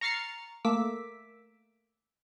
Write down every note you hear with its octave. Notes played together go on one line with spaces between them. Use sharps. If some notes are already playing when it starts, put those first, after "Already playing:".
A#5 C#6 F6 A6 C7 C#7
A3 A#3 D6 E6 B6